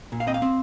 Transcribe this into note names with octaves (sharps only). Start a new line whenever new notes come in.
A#2
F5
C4 D#5
F5
C4